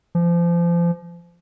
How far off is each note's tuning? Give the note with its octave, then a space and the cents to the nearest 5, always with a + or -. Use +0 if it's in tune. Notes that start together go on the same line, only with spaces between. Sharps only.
F3 -30